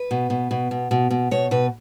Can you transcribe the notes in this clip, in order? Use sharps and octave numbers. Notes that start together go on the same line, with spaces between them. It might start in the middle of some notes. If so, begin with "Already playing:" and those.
Already playing: B4
B2
B2
B2
B2
B2
B2
B2 C#5
B2 B4